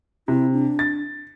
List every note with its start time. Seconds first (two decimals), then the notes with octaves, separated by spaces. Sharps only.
0.28 C3 E4
0.52 D4
0.79 A6